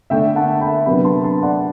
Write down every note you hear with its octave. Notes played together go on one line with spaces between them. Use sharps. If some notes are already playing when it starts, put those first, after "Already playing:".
D3 A3 D4 E5 G5
F#5 A5
G5 B5
C3 F#3 B3 D4 G5 B5
A5 C6
A5 C6
D5 F#5